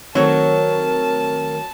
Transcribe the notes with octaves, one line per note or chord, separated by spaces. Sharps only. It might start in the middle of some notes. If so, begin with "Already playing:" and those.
D#3 F#3 A3 C4 A#4 C#5 A5